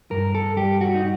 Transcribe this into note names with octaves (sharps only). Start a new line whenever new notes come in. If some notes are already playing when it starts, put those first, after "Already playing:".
G2 A#4
A4
G3 G4
F#4
D#4